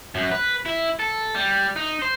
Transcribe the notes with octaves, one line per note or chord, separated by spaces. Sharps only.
F#2
B4
E4
A4
G3
D#4
C5